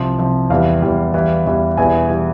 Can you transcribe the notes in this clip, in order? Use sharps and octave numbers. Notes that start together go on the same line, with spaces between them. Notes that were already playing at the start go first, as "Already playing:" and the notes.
Already playing: C2 C3 F3
C2 C3 F3
E2 E3 G3 F5
E2 E3 G3
E2 E3 G3
E2 E3 G3
E1 E2 E3 G3 G#5
E3 G3